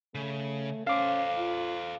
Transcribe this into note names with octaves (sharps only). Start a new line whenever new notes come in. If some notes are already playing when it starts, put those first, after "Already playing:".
C#3 A3
C#4 A4 C5 F5 D6
F4